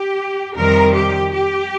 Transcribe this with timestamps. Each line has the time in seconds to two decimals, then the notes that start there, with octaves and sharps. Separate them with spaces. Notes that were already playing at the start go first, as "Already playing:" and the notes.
Already playing: G4
0.55 F2 C3 D#3 G3 A#4
0.94 G4
1.32 G4